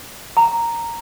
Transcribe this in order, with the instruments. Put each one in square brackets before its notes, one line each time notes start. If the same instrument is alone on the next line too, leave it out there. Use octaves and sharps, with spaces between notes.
[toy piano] A#5